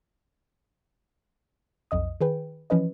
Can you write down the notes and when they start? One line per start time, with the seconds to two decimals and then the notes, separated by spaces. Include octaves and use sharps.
1.91 B1 F2 D#5 D#6
2.21 D#3 G#4 B4 G5
2.70 E3 F3 C#4 B4 D#5